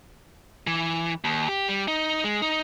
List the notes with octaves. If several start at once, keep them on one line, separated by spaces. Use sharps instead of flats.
E3
D#2
G4
G3
D#4
G#3
D#4